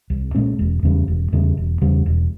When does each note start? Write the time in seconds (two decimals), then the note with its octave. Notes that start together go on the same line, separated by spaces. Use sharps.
0.10 C2
0.35 A#2 G#3 C#4
0.59 E1
0.83 E2 C#3 G3
1.08 E1
1.33 E2 C#3 G3
1.57 E1
1.81 E2 C#3 G3
2.06 E1